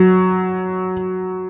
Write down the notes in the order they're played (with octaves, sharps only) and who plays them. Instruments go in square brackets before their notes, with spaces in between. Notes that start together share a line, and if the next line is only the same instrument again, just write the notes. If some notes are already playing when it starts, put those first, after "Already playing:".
Already playing: [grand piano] F#3